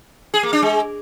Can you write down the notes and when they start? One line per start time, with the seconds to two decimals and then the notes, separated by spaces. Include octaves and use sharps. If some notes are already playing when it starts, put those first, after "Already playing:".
0.34 G#4
0.43 A#3
0.53 D4
0.62 G#3